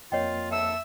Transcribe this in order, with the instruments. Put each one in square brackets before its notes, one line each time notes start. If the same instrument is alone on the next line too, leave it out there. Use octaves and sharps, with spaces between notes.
[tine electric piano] F2 A#3 C7 [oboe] F4 [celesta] C#5 D#5 G5
[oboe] A4 [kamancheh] E5 E6